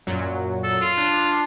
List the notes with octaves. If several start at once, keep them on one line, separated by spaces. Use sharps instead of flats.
F#2 A#2 F#3
A4
F4
D4